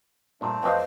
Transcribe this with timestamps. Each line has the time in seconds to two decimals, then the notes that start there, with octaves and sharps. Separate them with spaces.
0.41 G2 A#2 A3 C4 D4
0.63 F2 F#3 B4 C5 D#5 F5